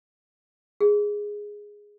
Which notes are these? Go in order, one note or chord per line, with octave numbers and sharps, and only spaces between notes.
G#4